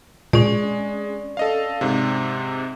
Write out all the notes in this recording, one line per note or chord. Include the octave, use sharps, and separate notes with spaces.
A#2 G#3 C#4 D5
A4 D#5 F5
G#2 C3